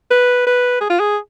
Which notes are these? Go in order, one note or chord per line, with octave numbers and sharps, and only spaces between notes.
B4
B4
G#4
F4
G#4